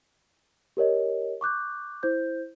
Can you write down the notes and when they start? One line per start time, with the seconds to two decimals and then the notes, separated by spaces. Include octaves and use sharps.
0.77 G4 A#4 C#5 D#5
1.41 C#6 D6 F#6 G6
2.03 E4 C5 G6